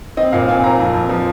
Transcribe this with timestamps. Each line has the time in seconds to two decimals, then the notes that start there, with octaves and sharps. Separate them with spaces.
0.17 C4 D#5
0.32 A#2 F5
0.48 C4 G#5
0.64 A#2 A#5
0.79 F2
0.94 F2
1.09 F3